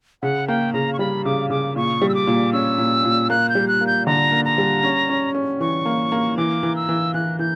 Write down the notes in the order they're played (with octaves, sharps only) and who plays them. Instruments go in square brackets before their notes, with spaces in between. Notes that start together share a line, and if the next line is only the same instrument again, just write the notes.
[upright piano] C#3 [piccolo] F#5
[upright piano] A#3 [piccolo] G5
[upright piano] C#3 [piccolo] A#5
[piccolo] C#6
[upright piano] G3 [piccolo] B5
[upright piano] C#3 [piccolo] D6
[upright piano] C#3 [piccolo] D6
[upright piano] A#2 [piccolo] C#6
[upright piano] G3
[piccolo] E6
D6
[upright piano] A#2
[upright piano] C#4 [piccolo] E6
[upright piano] A#2
A#2
[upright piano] A#3 [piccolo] F#6
[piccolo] G6
[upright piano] G3
[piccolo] F#6
[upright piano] A#3
[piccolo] G6
[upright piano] D3 [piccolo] A#5
[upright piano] A#3
[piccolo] A#5
[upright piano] G3
C#4
C#4
C#4
[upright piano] E3 [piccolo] C#6
[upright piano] A#3
A#3
[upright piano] E3 [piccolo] D6
[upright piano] E3
[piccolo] E6
[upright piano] E3
[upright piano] E3 [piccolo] F#6
[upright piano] E3 [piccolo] G6